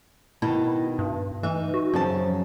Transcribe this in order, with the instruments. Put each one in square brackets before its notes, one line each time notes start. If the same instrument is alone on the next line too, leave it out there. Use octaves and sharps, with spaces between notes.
[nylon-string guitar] B2 D#3 A5 [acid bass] E4
[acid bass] G2
[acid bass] E3 [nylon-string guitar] D#4 E5
[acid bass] F#4
[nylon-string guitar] F#2 C#3 A5 [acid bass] F3